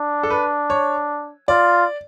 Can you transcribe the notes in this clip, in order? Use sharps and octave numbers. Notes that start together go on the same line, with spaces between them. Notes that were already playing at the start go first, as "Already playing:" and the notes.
Already playing: D4
A4
B4
C#5
F4 D5